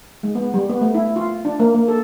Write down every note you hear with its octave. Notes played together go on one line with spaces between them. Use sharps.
G#3
B3
G3
B3
A3
E4
F4
D4
A#3
A#3
A4